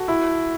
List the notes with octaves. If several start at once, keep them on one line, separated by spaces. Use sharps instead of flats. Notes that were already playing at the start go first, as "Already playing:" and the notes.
Already playing: F#4 A4
E4